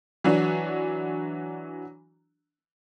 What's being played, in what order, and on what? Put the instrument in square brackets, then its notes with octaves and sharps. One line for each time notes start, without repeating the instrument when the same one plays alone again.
[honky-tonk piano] E3 F#3 D4 F#4